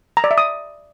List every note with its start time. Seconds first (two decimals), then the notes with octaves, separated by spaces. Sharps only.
0.17 A#5
0.24 D5
0.31 E5
0.38 D#6